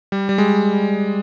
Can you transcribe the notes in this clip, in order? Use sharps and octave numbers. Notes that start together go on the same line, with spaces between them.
G3
G3
G#3